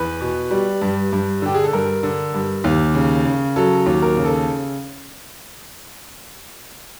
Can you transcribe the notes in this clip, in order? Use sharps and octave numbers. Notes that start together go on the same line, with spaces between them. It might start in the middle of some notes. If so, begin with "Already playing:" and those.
Already playing: E2 B4
B2
G3
G2
G2
D3 G4
G#4
A4
G2 A#4
D3
G2
D#2
C#3
C#3
F#3 A4
D#2
A#4
C#3
A4